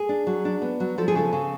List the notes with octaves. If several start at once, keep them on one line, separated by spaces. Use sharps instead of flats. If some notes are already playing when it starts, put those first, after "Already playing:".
Already playing: G#4
D4
F#3
D4
B3
F#3
F3 A4
G#4
C#3 A4
C#3